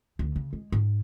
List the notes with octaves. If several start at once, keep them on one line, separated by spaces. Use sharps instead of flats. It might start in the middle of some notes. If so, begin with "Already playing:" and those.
D2
C#3
G#3
G#2